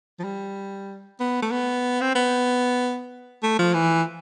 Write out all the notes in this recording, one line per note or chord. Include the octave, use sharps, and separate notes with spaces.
F3
G3
B3
A3
B3
C4
B3
A3
F3
E3